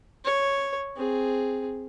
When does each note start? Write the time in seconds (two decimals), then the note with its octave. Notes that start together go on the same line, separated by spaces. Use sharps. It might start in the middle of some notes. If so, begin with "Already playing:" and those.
0.25 C#5
0.97 C4 G#4